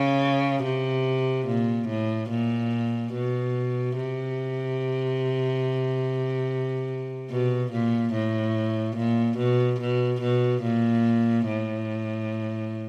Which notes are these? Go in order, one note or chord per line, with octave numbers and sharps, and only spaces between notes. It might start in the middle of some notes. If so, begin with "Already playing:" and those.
Already playing: C#3
C3
A#2
A2
A#2
B2
C3
B2
A#2
A2
A#2
B2
B2
B2
A#2
A2